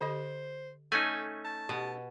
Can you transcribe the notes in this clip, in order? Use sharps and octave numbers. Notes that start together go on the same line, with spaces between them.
D3 G4 C5 D#5
A3 C#4 D#4 A4 G#5
A5
B2 G4